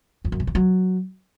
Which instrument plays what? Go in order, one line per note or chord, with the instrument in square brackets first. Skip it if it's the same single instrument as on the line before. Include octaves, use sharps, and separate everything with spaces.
[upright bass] F2
F#2
C#3
D#3
F#3